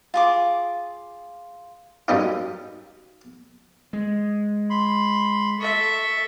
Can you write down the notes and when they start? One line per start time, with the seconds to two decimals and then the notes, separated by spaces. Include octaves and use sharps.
0.14 F4 G#4 D6
2.08 F#2 G3 D#4 F4
3.93 G#3
4.70 B5 C6
5.59 A4 E5 C#6